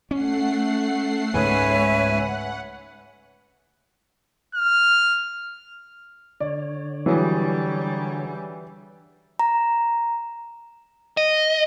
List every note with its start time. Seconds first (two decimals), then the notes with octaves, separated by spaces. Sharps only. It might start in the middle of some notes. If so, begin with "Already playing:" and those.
0.11 A3 C#4 F#5 C7
1.34 C#2 G#2 G#3 C#4 B4 C#5 E5 G#5
1.92 F#5
4.55 F6
6.40 D3 C#5 D5
7.06 E3 F#3 G3 G#4
9.39 A#5
11.17 D#5